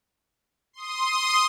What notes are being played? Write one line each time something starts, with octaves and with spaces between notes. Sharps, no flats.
C6 D#6